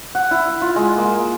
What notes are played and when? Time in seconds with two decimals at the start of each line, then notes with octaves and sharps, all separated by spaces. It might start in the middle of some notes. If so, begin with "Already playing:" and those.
0.15 F#5
0.31 E4
0.62 F4
0.76 G#3
0.98 A#3